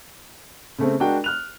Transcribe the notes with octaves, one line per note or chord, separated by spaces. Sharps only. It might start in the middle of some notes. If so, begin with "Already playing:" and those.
C#3 A3 C4
G#3 D4 F#4 A#4 G5
F6 F#6 F7